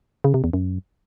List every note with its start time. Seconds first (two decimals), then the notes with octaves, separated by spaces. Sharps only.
0.24 C#3
0.34 C3
0.44 E2
0.53 F#2